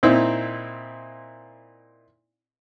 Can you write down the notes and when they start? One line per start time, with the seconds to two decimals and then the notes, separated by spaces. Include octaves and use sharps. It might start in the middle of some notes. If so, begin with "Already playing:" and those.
0.03 A#2 C4 D#4 E4